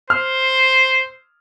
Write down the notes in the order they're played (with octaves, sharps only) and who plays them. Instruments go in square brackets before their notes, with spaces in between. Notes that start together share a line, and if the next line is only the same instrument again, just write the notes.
[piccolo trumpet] C5 [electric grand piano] F6